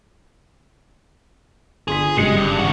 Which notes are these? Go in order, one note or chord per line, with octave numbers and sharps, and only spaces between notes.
G1 G#4 C6 B6
F#1 G3 G#3 C#7
G2
D#3 F#4